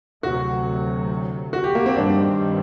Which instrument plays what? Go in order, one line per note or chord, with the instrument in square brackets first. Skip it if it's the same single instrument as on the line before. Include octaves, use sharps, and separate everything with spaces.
[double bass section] D2 C3 F#3 [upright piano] F#4
[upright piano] F#4
G4
A#3
C4
[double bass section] G2 D#3 G3 C4 [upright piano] D4